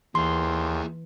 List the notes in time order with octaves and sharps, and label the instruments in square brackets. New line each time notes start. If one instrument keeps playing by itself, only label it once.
[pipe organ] D#2 [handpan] E3 [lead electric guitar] E4 G#4 [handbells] C6